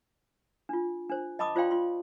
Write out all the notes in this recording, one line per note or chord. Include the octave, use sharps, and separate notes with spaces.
D4 F4
D4 C5
D#5 A5 B5 D6 D#6
F4 C5 D5 F5 G5 C6
F4 C6